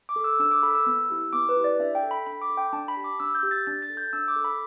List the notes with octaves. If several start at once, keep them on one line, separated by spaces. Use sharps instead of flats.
D6
A4
E6
D4 E6
D6
A4 B5
E6
B3
E4 G4
B3 D6
B4
E4 G4
D5
D4 E5
G5
A4
B5
D4 B5
D6
A4
G5
D4 A5
B5
G4
D6
D4 E6
G6
G4
A6
D4 A6
A6
A4
G6
D4 E6
D6
A4
B5